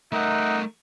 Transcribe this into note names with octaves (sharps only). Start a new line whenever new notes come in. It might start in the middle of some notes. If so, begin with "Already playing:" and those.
A3 D#4 A#4 E5 F#5